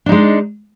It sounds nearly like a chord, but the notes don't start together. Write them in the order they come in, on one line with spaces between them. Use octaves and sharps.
D4 D#4 G#3